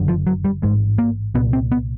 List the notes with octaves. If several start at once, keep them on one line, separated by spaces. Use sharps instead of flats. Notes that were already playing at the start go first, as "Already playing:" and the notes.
Already playing: F#1 F#2 D3
F3
F#3
G3
A1 G#2 G#3
A#3
C2 A#2 B3
C4
B3